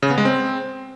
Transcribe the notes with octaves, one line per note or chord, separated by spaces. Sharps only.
C#3
B3
G#3
C4